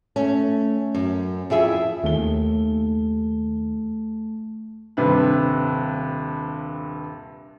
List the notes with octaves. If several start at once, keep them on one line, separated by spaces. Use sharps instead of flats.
A3 C#4
F#2
F2 E4 G#4 E5
D#2 A3 G7
D#1 G2 C3 B4